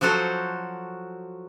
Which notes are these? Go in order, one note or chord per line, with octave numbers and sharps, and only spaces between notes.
F3 F#3 F#4 A4 C5